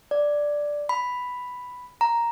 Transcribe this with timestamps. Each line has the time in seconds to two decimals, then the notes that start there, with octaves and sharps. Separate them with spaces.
0.11 D5
0.89 B5
2.01 A#5